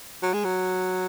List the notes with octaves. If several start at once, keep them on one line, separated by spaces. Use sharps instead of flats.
F#3
G#3
F#3